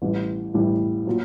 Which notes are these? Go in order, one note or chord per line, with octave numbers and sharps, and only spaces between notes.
A1 A2 G3
A1 A2 G3
A#2 F#3